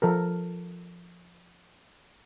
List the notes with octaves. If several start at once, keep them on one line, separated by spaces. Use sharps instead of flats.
F3 A4 A#4